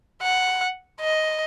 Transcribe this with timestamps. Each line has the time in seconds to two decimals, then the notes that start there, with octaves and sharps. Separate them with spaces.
0.22 F#5
1.01 D#5